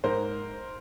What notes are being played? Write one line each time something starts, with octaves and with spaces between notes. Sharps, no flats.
G#2 A#4 C5